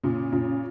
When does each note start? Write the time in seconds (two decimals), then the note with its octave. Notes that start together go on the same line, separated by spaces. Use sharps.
0.04 A#2 C#3
0.32 A#2 C#3